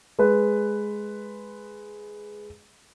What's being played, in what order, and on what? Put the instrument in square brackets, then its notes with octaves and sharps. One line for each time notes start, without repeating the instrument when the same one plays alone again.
[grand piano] G#3 B4